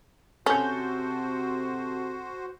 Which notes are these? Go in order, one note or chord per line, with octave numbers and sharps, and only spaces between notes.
C3 C#4 F#4 A4 C5 G6